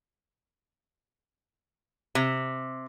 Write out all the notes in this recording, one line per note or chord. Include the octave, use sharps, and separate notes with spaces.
C3